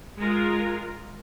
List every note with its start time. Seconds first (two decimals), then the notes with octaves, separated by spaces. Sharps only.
0.18 G#3 F4 A#4